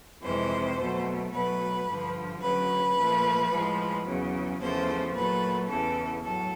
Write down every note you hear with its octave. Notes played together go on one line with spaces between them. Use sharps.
F2 C3 E3 G#3 C5
B2 F#3 A3
B2 F#3 A3 B4
G2 D3 F3
D2 C#3 F#3 B4
A#2 F3 A3
A2 F3 G#3
E2 C#3 F#3
E2 C#3 F3 A3 C5
A#2 F#3 A3 B4
E2 C#3 E3 A4
A2 F#3 A4